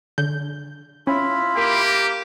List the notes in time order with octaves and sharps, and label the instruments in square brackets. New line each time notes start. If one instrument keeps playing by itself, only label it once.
[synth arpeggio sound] D3 G6
[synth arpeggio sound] C#4 [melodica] E4 F4 B5
[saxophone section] A#3 [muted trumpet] G4